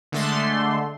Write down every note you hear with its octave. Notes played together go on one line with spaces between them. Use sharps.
D3 G#3 A3 A4 C6